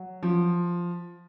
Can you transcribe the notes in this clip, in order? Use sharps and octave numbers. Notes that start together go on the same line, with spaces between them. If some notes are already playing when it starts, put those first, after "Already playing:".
Already playing: F#3
F3